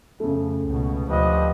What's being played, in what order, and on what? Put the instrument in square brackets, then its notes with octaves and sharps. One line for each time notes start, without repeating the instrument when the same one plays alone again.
[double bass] F2 [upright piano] C#3 A3
[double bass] C#2 B2
[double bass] D2 F3 [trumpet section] G4 B4 D#5